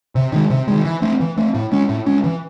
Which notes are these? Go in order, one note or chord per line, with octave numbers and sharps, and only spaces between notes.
C3
D#3 G#3
C3
D#3 G#3
E3
A3 C4
E3
A3 C4
A2
G#3 C#4
A2
G#3 C#4
E3